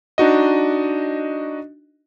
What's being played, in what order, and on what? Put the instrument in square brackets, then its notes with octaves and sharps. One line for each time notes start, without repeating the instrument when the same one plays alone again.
[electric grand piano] D4 D#4 F#4 D#5